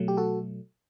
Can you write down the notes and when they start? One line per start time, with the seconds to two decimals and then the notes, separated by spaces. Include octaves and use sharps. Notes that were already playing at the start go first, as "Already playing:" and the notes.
Already playing: B2 F#3 A3
0.08 G4
0.17 F#4 A4